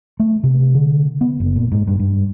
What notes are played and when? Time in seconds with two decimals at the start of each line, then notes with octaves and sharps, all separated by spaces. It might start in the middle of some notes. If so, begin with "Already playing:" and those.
0.20 A3
0.44 C3
0.74 D3
1.21 B3
1.40 F#1
1.56 A#2
1.72 G#2
1.87 G2
1.99 G2